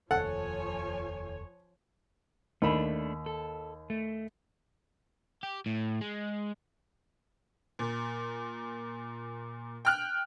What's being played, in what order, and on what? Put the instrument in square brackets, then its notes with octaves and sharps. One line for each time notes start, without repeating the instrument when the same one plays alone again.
[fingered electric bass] F1 D#2 [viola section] F3 C#5 G#5 [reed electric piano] A4 [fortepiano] F#5
[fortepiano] D#2 B5 [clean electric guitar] A3 D4
[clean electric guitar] A4
A3
[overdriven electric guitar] G4
A2
G#3
[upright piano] A#2
G5 F6 F#6